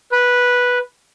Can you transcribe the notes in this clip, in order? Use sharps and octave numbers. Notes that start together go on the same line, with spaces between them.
B4